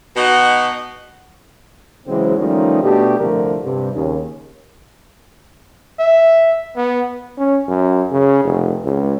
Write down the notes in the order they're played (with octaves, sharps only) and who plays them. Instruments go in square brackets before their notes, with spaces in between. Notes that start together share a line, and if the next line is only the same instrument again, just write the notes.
[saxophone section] B2 D#4 F#4
[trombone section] C#3 E3 F#3 G#3 C4
D#3 F3 G3 A3 C#4 D#4
B2 A3 D4 G4
C2 D3 F3 A3 A#4
G2 C3
D#2 C#3
[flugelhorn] E5
B3
[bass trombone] C#4
F#2
C#3
F1
C#2